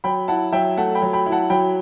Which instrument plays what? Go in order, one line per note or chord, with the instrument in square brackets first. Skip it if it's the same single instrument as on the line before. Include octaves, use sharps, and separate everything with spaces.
[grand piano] F#3 G5 B5
E4 F#5 A5
F#3 E5 G5
A3 F#5 A5
G5 B5
F#3
G5 B5
E4
F#5 A5
F#3 G5 B5